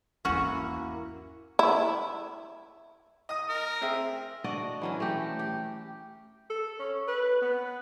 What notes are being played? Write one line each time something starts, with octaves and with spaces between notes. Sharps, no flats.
G#1 E2 A#3 C#4 E4 F#4
E4
D#5 D#6
A#4
C4 G#4 E5
D4 F#4 D5 D#5
E3 F#3 C#4
A3 G4
G4
A4
C#4
B4
B3